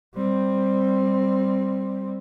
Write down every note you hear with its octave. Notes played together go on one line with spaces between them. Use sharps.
G3 C4